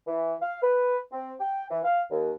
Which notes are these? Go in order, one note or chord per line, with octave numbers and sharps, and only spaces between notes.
E3
F5
B4
C4
G5
E3
F5
D#2